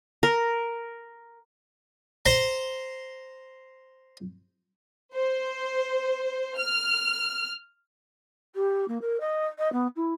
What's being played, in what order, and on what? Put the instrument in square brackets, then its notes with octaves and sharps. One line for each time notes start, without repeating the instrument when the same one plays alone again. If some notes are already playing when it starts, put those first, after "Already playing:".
[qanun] A#4
[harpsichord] C5 A#5 C6
[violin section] C5
F6
[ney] G4
A#3
A#4
D#5
D#5
B3
E4